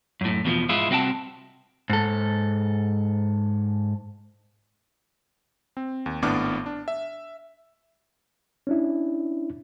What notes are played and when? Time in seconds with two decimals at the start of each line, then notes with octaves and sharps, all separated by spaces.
0.21 F#2 A2
0.45 E2 B2 D#3 F3
0.69 G#2 G#3 E4 F4
0.90 C2 C4 F#4 G5 A5
1.90 G#2 A4
5.77 C4
6.06 D#2
6.22 G#1 A2 B3 D4 D6 F6
6.66 D4
6.88 E5
8.67 C#4 D4 E4